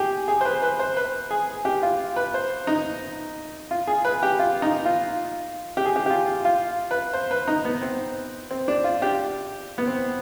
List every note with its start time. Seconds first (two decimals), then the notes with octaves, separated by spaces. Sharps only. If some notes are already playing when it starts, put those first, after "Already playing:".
Already playing: G4 G#4
0.28 G#4
0.41 C5
0.45 B4
0.62 B4
0.79 C5
0.97 B4
1.31 G#4
1.65 G4
1.83 F4
2.16 B4
2.34 C5
2.67 D#4
3.71 F4
3.87 G#4
4.05 B4
4.23 G4
4.39 F4
4.62 D#4
4.85 F4
5.77 G4
5.85 G#4
5.96 G4
6.06 G4
6.10 F4
6.45 F4
6.91 B4
7.13 C5
7.31 B4
7.48 D#4
7.65 B3
7.82 C4
8.51 C4
8.68 D4
8.84 F4
9.02 G4
9.78 B3
9.87 C4